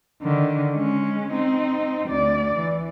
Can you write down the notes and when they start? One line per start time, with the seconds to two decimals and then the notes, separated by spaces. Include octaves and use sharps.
0.23 D3 D#3
0.73 G#3 C#4
1.31 C4 D#4
2.09 D2 D5
2.57 E3